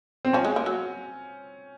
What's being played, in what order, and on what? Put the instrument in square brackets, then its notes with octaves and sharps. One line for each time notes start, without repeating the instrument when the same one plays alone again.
[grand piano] C4
[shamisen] F3 [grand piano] C#4
[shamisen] G#3
A#3
F#3